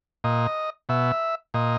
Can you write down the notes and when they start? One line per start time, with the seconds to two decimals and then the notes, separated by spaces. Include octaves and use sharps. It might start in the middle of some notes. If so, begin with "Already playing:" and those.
0.24 A#2 D#5
0.89 B2 E5
1.54 A#2 D#5